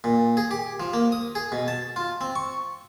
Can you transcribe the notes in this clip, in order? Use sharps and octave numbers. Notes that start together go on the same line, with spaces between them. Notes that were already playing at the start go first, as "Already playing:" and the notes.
A#2
G#4
G4
F3
A#3
D#6
G#4
B2
A5
F4
C4
C#6